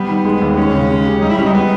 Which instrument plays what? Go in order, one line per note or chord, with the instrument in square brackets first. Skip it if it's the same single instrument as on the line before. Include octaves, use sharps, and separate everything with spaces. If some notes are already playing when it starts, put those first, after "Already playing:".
Already playing: [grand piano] G3 [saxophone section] B3
[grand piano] D#3
G#3
D#2
[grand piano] G#3 [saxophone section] C#4
[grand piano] C#3
G#3
G4
[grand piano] G3 [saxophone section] D#4
[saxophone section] E4
[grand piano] G3 [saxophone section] C#4
[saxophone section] D#4
[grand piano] G#3 [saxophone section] B3